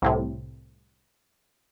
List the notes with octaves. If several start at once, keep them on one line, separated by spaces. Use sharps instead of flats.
C2 A2 C3